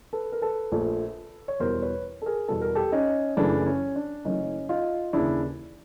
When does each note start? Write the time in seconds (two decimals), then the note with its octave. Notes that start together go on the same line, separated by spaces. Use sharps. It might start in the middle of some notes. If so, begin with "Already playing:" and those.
0.13 A4 B4
0.32 A#4
0.42 A4 B4
0.72 A#1 A#2 F3 A3
1.48 C#5
1.60 E2 B2 G3 B3 A#4 C5
1.82 B4 C#5
2.22 A4
2.26 G#4 A#4
2.48 E2 B2 G3 B3 A4
2.62 A#4
2.75 G4 A4
2.92 C#4 D#4
3.37 F#1 F#2 C#3 E3 A3 D4
3.66 C#4
3.96 D4
4.25 F#1 F#2 C#3 E3 A3 C#4 D#4
4.69 D#4 F4
5.13 D#2 C#3 E3 D4 E4